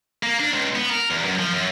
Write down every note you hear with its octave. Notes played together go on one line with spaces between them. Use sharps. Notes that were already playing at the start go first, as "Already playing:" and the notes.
A#3
D4
C#2
B3
A#4
E2
F#2
F3
F#2